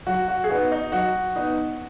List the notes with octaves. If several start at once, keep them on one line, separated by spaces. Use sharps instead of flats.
F#3 F#4
F#4
G#4
B3 D#4 F#4 B4
D#4
F#3 F#4
B3 D#4 B4